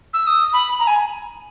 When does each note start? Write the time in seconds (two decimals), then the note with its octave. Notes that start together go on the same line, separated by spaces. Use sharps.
0.13 E6
0.27 D#6
0.53 B5
0.79 A#5
0.87 G#5